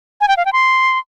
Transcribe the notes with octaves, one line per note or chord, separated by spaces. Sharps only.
G#5
G5
F5
G5
C6